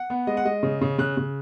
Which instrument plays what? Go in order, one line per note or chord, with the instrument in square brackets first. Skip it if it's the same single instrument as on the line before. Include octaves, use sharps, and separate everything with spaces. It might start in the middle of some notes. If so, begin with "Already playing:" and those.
Already playing: [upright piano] F#5
B3
G#3 D#5
F#5
G#3 D#5
C#3
C#3
C#3 F#6
C#3